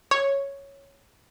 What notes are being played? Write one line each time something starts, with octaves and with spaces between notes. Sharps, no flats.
C#5